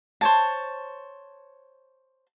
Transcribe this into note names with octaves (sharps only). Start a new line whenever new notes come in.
C5 C#5 A5